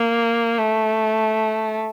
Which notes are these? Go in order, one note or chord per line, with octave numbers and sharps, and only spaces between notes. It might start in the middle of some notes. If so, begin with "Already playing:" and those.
Already playing: A#3
A3